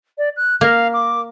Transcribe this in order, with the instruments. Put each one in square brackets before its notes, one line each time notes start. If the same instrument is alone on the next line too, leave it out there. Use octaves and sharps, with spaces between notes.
[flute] D5
F#6
[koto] A#3 [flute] F5
[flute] D6